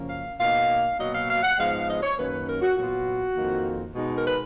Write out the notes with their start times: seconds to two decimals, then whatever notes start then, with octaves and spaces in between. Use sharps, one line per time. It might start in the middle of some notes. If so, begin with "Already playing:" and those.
Already playing: F#2 C#3 F3 A#3 C#4
0.09 F5
0.39 B2 A#3 D#4 F5
0.98 B2 F#3 A#3 D#5
1.13 F5
1.28 F5
1.43 F#5
1.58 G#2 F3 G#3 B3 F5
1.88 D#5
2.02 C#5
2.17 F#2 D#3 A#3 C#4 B4
2.47 A#4
2.62 F#4
2.76 A#2 F#3 B3 F4 F#4
3.36 F2 D#3 A#3
3.95 B2 G#3 D#4
4.15 A#4
4.25 B4